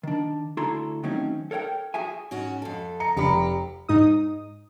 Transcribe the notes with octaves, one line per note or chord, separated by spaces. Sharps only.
D#3 D4
D2 E4 F#4 A4 A#5 C6
D#3 F#3 A3 C4 C#4
A4 A#4 C#5 F#5 G5
F#4 G#4 E5 G#5
G#2 C#4 F#4
F2 A4
A#5 C#7
F1 F4 G4 B5 C#7
G#2 D#4 D#6